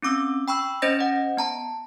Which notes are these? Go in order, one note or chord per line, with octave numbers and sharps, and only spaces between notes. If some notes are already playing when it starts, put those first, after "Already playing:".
C4 C#4 D6 E6
G5 B5 C#6 E6
C#4 C5 D#5 G6 A6 A#6
D#5 F#5
B3 A5 A#5